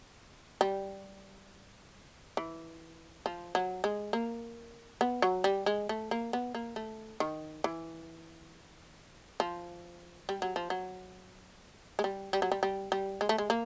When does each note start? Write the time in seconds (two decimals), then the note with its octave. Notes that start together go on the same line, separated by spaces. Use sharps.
0.61 G3
2.37 E3
3.26 F3
3.55 F#3
3.84 G#3
4.13 A#3
5.01 B3
5.22 F#3
5.44 G3
5.66 G#3
5.89 A3
6.11 A#3
6.33 B3
6.55 A#3
6.76 A3
7.20 D#3
7.64 E3
9.40 F3
10.29 G3
10.42 F#3
10.56 F3
10.70 F#3
11.99 G#3
12.04 G3
12.33 G3
12.42 F#3
12.52 G3
12.63 G3
12.92 G3
13.21 G#3
13.29 A3
13.38 G#3
13.50 A#3